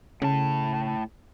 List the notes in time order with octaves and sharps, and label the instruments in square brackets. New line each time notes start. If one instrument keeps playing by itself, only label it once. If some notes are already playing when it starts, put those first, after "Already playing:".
[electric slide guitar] A2 A5 [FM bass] C#3